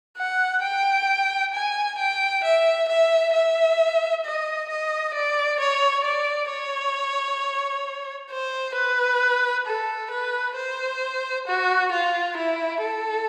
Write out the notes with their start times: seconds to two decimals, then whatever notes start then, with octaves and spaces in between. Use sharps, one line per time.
0.18 F#5
0.63 G5
1.54 G#5
1.98 G5
2.43 E5
2.88 E5
3.33 E5
4.24 D#5
4.69 D#5
5.14 D5
5.60 C#5
6.04 D5
6.50 C#5
8.30 C5
8.75 B4
9.66 A4
10.11 B4
10.56 C5
11.47 F#4
11.91 F4
12.37 E4
12.82 A4